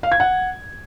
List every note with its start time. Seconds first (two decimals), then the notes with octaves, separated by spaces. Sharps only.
0.03 F5
0.12 G#6
0.20 F#5